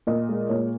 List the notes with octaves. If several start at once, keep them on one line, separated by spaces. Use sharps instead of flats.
A#2 D#5
G#3
A#2 C#5